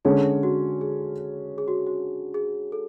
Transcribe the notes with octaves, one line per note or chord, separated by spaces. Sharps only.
D3 G#3 C#4 A4
F#4
G#4
G#4
F#4
F#4
G#4
A4